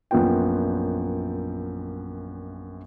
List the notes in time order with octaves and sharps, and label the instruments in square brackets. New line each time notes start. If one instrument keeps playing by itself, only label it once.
[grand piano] A#1 F#2 A#2 B3 F4 G5